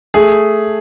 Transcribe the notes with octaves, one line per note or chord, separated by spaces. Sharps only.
A3 G#4